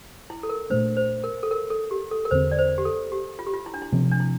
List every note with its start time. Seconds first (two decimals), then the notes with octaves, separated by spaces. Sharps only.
0.30 E4
0.43 A4
0.49 A#4
0.70 A#2 A3 D4 C5
0.97 C5
1.24 A#4
1.43 A4
1.51 A#4
1.70 A4
1.91 G4
2.11 A4
2.25 A#4
2.31 E2 D3 A3 C4 C5
2.52 D5
2.58 C5
2.78 G4
2.85 A4
3.12 G4
3.39 F4
3.47 G4
3.54 F4
3.66 E4
3.74 D4
3.82 E4
3.92 C3 F3 C4
4.12 D4
4.20 E4